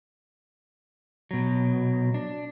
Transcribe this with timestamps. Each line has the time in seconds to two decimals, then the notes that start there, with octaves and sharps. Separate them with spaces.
1.31 B2 F#3
2.14 D4